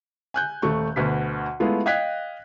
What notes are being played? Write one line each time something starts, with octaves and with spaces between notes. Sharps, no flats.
G#5 F#6 G6
D#1 A3 C#6
D2 B2 B4 B6
G#3 A3 B3 E4 F4
D#5 F5 G5 F#6 G#6 B6